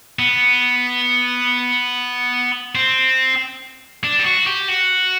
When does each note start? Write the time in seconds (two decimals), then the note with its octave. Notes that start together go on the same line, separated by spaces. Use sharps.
0.19 B3
2.75 C4
4.04 D4
4.19 G4
4.25 F#4
4.47 G4
4.68 F#4